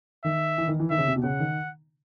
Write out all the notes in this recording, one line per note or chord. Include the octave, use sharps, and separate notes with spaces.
D#3 E5
E3
D#3
E3
D#3 E5
C#3
C3
B2
C#3 F#5
D#3